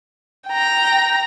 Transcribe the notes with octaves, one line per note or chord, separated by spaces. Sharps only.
G5 A#5